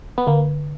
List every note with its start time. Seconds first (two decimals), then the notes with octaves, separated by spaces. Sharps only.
0.18 B3
0.27 D3 A#3